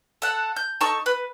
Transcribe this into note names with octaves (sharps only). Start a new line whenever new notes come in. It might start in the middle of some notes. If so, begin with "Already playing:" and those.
A4 F#5
G6
D#4 A4 A5 C#6
B4